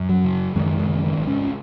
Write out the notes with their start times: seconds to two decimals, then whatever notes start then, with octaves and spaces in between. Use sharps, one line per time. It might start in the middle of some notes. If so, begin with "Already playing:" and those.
Already playing: F#2
0.09 F#3
0.24 C#3
0.55 F#2 D#3 G#3
0.79 D#3 G#3
0.87 C#3
1.03 D#3 G#3
1.18 G#1
1.26 G#3 C#4